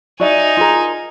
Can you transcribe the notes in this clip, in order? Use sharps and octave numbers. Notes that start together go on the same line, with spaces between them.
D#4 F#4 D5 E5 G#5
F4 G#4 A#4